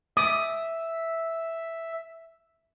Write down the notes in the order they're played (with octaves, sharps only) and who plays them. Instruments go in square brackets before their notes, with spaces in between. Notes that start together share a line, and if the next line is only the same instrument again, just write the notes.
[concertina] E5 [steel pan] D6 D#6